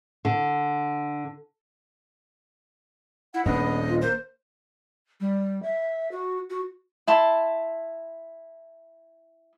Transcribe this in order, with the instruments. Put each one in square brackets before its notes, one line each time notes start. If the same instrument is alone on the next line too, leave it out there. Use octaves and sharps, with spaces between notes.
[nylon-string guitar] D3
[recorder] E4 [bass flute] F#5
[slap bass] D#1 D4 [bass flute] B3 [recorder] D#5
[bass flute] F4
[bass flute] A#3 [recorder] C5
[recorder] G3
E5
F#4
F#4
[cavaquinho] E4 A5 C6